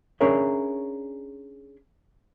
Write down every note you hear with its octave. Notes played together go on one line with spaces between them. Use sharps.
C#4 D4 G#4 A#4 C#5 E5